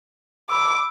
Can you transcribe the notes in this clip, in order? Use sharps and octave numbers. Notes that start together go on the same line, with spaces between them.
B5 D6 E6